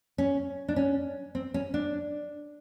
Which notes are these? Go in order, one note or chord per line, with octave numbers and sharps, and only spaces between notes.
C#4
D4
C#4
C4
C#4
D4